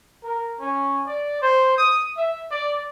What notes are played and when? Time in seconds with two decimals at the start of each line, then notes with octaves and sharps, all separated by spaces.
0.24 A#4
0.60 C#4
1.07 D5
1.42 C5
1.78 D#6
2.18 E5
2.50 D5